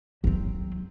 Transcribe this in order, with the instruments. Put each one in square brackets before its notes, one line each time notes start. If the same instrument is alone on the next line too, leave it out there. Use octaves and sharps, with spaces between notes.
[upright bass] F#3 C4